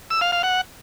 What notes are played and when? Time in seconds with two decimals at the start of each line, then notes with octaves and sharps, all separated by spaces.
0.10 E6
0.21 F5
0.32 F5
0.43 F#5